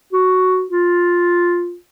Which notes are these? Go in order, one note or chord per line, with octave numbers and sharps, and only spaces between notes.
F#4
F4